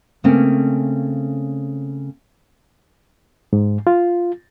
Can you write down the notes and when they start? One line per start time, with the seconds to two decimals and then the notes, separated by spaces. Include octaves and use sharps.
0.24 C#3 A3 A#3 C4 C#4
3.53 G#2
3.87 F4